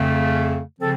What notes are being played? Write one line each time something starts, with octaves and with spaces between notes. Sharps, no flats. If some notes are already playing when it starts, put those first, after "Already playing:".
Already playing: F2 C#3 A3
C#3 F3 C4 A4